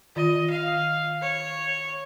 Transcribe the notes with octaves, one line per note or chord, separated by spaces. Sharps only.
D#3 F4 D#5
F5
C#5